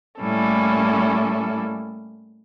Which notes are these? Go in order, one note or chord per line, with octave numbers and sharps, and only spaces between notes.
A2 G3 A#3 C#4 E4 A4